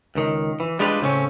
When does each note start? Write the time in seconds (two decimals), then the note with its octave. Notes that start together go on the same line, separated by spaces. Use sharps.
0.15 C#2 D#3
0.60 E3
0.79 G3 G#3 D4 F4 G4 B4
1.01 A2 C#3 C4 C#4